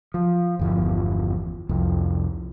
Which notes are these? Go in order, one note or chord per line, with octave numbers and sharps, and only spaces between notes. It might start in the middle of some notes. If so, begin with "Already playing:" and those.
F3
G1 E2 F3
C2 F2